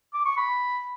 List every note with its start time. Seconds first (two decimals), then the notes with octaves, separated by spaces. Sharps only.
0.14 D6
0.26 C#6
0.37 B5